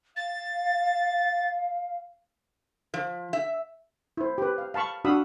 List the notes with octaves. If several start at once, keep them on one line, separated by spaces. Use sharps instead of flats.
F5 A6
F3
E5
E4 C5
G4 B4
F5
F5 A5 B5 C#6
D4 F#4 F5 B5 D#6 E6